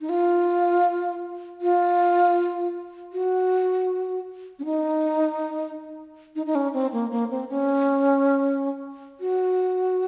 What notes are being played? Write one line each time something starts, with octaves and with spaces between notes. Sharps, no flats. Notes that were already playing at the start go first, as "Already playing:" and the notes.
D#4
F4
F4
F#4
C#4
D#4
D#4
D#4
C#4
C4
A#3
A#3
C4
C#4
F#4